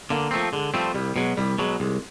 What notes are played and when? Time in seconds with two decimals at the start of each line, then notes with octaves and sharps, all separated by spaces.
0.10 D3 A#3
0.31 F3 A3 C4
0.52 D3 G#3
0.73 F3 G3 A3 C4
0.94 C2 G3
1.16 B2 F#3 G#3
1.37 C2 G3
1.58 B2 F#3 G#3
1.80 C2 G#3